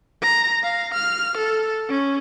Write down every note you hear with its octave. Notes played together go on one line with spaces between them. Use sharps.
A#5
F5
F6
A4
C#4